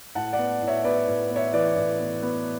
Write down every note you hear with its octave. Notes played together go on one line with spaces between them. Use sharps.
A2 F#5 A5
D5 F#5
B3
A2
C#5 E5
B3 B4 D5
A2
B3
C#5 E5
E3 B4 D5
A2
B3
B3